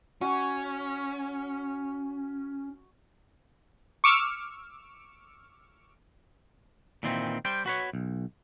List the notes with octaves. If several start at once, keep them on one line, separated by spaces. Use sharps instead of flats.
C#4 F#4
C#6 D6 E6 F6 C#7
A#2 D#3 E3 C4
G3 C5 G5
F#4 B4 C#5
B1